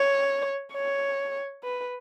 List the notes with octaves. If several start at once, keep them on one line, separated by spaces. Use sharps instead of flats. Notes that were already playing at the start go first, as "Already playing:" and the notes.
Already playing: C#5
C#5
B4